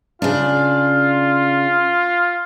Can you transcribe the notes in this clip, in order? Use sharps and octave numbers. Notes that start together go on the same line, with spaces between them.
C#3 D4 F4